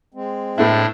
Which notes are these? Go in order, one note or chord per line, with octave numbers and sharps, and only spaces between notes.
G#3 C4
A2 A3 B3 D4 E4